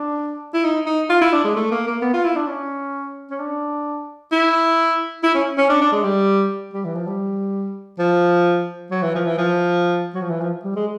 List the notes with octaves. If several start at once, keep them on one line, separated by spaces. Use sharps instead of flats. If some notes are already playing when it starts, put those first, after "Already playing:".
Already playing: D4
E4
D#4
D#4
F4
E4
D4
G#3
A3
A#3
A#3
B3
F4
E4
D4
C#4
C#4
D4
E4
E4
C#4
C#4
D4
D4
G#3
G3
G3
E3
F3
G3
F3
F#3
E3
F3
E3
F3
F#3
F3
E3
F3
G3
G#3